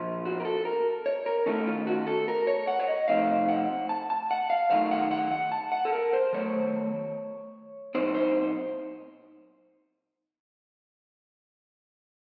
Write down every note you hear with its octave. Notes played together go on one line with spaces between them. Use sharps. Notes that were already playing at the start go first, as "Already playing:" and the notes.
Already playing: A#2 F3 A#3 F4
F#4
A#4
A4
A#4
C#5
A#4
D#3 A3 C#4 F4 A4
F4
F#4
A4
A#4
C#5
F#5
C#5
D#5
C3 F3 A3 C4 D#4 F5
F#5
A5
A5
F#5
F5
D#3 F#3 A3 D#4 F5
F#5
F#5
F#5
A5
F#5
A4
A#4
C5
D#3 F#3 A3 C#5
A#2 F#3 C4 D#4 C5
C5